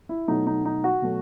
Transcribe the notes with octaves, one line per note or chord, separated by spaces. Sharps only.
E4
B2 F#3 A3 D#4
D#4
D#4
F#4
B2 F#3 A3